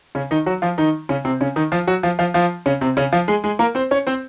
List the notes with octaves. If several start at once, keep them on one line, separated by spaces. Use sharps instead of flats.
C#3 C#4
D#3 D#4
F#3 F#4
F3 F4
D#3 D#4
C#3 C#4
C3 C4
C#3 C#4
D#3 D#4
F3 F4
F#3 F#4
F3 F4
F3 F4
F3 F4
C#3 C#4
C3 C4
C#3 C#4
F3 F4
G#3 G#4
G#3 G#4
A#3 A#4
C4 C5
C#4 C#5
C4 C5